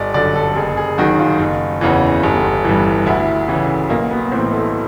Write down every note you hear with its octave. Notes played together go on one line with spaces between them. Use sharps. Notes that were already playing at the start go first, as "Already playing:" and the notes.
Already playing: G1 D5 D#5
F#2 D3 D5
A4
F#1 G#4
G#4
F#2 D#3 F#4
F4
F#1
E2 C#3 E3
G1
G2 E3
D2 E4
C#3 E3
B1 A#3
B3
A2 E3 C4
A3